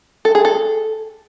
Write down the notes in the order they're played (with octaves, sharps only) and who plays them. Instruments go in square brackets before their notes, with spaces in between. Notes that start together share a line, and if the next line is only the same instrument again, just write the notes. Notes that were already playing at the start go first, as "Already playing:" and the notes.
[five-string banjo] A4
G#4
A4